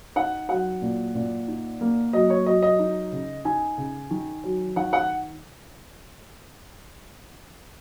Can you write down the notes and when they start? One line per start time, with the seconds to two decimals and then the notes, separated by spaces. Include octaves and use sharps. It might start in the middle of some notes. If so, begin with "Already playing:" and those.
0.16 D#4 F#5
0.49 F#3 F#5
0.82 A#2
1.15 A#2
1.48 D#4
1.81 A#3
2.13 F#3 D#5
2.30 C#5
2.46 F#3 D#5
2.62 D#5
2.79 D#4
3.12 C#3
3.45 D#4 G#5
3.78 C#3
4.11 D#3
4.44 F#3
4.76 D#3 F#5
4.93 F#5